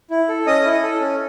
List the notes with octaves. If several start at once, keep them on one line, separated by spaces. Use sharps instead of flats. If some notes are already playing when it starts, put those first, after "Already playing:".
E4
A4
C#4 D#5 D#6
E4
A4
C#4